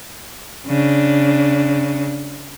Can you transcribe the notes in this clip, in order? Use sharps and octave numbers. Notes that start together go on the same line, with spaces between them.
C#3 D4